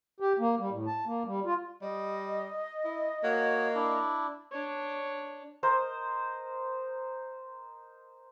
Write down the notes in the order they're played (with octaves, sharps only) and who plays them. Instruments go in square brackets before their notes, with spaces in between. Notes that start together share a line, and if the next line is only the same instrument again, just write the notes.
[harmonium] G4
A#3
G3
A2
A5
A#3
G3
F4
[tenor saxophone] G3 [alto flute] D#5
[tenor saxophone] E4
[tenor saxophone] A#3 [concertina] F#4 C#5
[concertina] D4 E4
[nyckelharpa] D4 C#5
[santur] A#4 C5 D#5